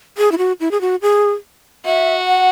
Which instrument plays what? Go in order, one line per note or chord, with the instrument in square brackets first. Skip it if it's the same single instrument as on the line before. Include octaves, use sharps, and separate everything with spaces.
[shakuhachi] G#4
E4
F#4
E4
G#4
F#4
G#4
[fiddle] F#4 [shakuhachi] E5
[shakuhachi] F#5